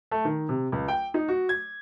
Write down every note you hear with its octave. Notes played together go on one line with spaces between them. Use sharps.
A3
D#3
C3
C#2
G5
D#4
F#4
G#6